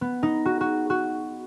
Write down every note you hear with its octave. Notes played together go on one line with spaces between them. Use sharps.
B3
D#4
F#4
F#4
F#4